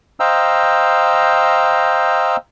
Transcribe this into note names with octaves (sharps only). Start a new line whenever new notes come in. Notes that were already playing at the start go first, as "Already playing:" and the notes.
C5 D#5 F5 G5 A#5 E6